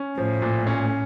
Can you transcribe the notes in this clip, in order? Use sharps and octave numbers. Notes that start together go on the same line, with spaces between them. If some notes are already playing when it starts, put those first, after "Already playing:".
Already playing: C#4
A2 F3
A#2
C#4